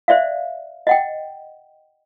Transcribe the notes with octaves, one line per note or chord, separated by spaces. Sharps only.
C5 D5 E5 F5
D#5 F#5 G5